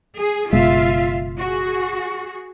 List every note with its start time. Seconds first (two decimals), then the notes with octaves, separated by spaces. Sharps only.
0.19 G#4
0.53 F#1 B2 G#3 F4 E5 F5
1.40 F#4 G#4